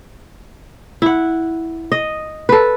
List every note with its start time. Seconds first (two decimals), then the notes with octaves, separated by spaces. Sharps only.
1.02 E4 F#5
1.92 D#5
2.49 A4 B4